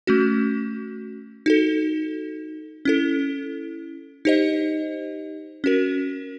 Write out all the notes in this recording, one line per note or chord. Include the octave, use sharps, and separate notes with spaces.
A3 C#4 F#4
D#4 F#4 A4
C#4 E4 A4
D#4 G4 C5 D#5
C#4 F#4 A#4